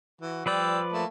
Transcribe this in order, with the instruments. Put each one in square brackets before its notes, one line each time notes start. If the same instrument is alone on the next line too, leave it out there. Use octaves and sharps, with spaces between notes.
[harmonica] E3 F#4
[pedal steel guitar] F3 B4 D5 [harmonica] G3 G5 E6
[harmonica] A3 A#3 A5